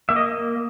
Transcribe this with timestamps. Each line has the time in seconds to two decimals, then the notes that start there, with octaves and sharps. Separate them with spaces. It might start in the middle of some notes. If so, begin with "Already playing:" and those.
0.09 A#3 E5
0.16 D#5